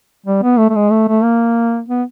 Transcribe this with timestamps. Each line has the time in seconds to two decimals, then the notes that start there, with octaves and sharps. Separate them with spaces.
0.26 G3
0.43 B3
0.58 A3
0.69 A3
0.75 G#3
0.91 A3
1.08 A3
1.23 A#3
1.88 B3